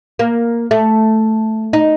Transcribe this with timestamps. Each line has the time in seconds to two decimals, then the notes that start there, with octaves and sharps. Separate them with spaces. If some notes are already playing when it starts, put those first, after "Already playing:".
0.19 A#3
0.71 A3
1.73 D#4